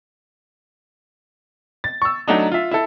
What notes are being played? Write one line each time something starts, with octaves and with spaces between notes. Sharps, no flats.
A6
C#6 E6
F#3 A3 D4 D#4
F4 E5
E4 A4